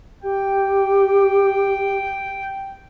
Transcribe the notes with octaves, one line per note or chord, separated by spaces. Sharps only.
G4 G5